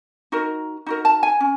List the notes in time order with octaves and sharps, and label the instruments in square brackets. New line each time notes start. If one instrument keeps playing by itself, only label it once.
[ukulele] D#4 F#4 A#4
D#4 F#4 A#4
A5
G#5
C#4